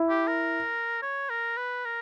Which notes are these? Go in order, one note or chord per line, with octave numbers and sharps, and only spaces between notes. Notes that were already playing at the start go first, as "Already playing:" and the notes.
Already playing: E4
G4
A#4
C#5
A#4
B4
A#4